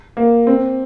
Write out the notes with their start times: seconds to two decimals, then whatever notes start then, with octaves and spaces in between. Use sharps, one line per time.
0.17 A#3
0.47 C4